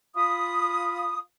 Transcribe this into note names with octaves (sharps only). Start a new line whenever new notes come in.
F4 B5 D#6